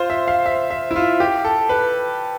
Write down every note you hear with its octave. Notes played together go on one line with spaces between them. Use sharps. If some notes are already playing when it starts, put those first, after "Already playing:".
Already playing: F4 C5
E5
F5
E5
E5
E4
F4
G4
A4
B4